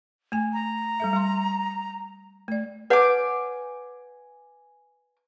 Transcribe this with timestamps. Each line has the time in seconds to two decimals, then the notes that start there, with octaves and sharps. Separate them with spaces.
0.32 A3 G#5
0.53 A#5
1.00 G3 A4 E5
1.13 G3 C6
2.48 A3 D5
2.90 B4 C#5 F#5 G#5 D6